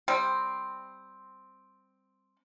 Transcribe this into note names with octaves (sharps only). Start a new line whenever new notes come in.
G3 C4